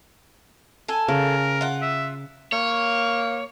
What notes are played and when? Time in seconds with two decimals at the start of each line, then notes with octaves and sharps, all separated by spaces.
0.88 A4 G#5
1.08 C#3 A#4
1.61 F4 F#5
1.82 E5
2.52 A#3 C#5